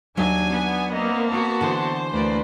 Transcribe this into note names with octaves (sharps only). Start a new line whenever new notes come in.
D#2 F#3 D4 E5 G#5
B3
A#3 C4 D#5
B3 F#4 A5
D3 E3 C5
D2 A#3 B4 D5